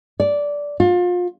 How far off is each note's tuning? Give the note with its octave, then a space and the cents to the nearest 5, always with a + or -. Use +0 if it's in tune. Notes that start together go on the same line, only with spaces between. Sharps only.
D5 -10
F4 +30